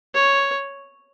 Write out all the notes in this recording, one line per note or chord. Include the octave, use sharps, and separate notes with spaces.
C#5